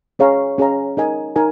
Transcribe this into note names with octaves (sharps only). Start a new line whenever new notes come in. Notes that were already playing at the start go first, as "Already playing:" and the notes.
C#4 G#4 C#5 F5 A#5
C#4 G#4 C#5 F5 A#5
D#4 A#4 D#5 G#5
D#4 A#4 G#5